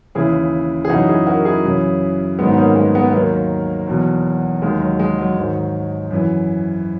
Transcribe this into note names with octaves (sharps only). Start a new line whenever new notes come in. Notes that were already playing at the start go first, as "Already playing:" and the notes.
D#2 C#3 E3 E4 G#4
G#4
F#2 C#3 E3 D#4 F#4
E4 G#4
F#4 A#4
E4 G#4
F#2 C#3 E3
G#2 D#3 F#3 G#3 B3
D#4
A#3 C#4
G#3 B3
G#3 B3
B3
D#2 D#3 F#3 A#3
E2 B2 F#3
D#2 D#3 F#3 G#3
F#3
G#3
F#3
G#2 D#3 F#3
F#2 E3